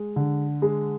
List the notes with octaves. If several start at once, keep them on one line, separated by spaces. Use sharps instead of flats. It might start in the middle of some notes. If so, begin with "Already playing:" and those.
Already playing: G#3
D3
G#3